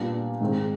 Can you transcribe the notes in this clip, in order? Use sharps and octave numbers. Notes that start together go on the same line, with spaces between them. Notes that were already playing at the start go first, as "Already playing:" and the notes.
Already playing: A#2 G3 B3 D4
G#2 D#3 G#3 C4